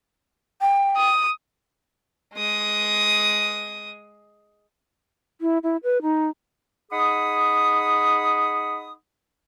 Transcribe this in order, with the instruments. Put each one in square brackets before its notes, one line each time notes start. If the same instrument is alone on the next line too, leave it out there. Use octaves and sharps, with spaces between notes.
[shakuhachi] G5
[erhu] D#6
[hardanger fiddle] G#3 D#6
[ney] E4
E4
B4
D#4
[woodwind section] D#4 G#4 F#5 B5 D#6